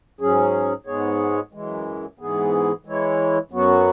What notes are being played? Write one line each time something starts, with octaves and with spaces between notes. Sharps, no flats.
G#2 F#3 C#4 G#4
G#2 G#3 B3 G#4 C#5
F#2 E3 G#3
G#2 E3 B3 G#4
E3 G#3 E4 C#5
F#2 F#3 B3 F#4